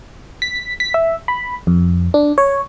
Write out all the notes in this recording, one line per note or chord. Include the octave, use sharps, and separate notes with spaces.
B6
B6
E5
B5
F2
D4
C#5